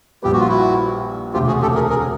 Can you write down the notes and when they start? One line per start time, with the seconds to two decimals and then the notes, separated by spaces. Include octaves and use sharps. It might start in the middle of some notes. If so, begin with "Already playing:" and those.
0.23 A#1 A#2 G3 B3 G4
0.32 F#4
0.39 F4
0.48 E4 F#4
1.33 E1 D2 C3 F4 G4
1.47 F#4 G#4
1.61 G4 A4
1.75 G#4 A#4
1.89 G#4 A#4